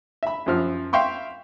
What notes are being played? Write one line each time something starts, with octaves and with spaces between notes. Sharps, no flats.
E5 B5
F#2 F3 F6
E5 F5 G5 C6 C#6